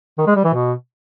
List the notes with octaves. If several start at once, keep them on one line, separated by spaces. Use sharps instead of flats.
D#3
G#3
G3
E3
B2